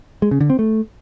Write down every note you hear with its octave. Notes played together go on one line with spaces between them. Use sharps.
G#3
C#3
D3
C4
A3